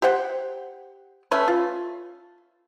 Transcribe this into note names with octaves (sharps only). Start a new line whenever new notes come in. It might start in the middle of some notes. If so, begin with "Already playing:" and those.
G4 C5 F#5 G5
A3 C#4 B4
F4